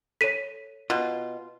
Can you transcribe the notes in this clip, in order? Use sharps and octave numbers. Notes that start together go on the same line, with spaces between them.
A4 C#5 B6 D#7
B2 F4